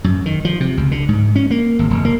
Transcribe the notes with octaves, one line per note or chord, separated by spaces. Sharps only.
F#2
D#3
F3
C3
C#2
D3
G#2
C#4
A#3
G#1
F1
A#3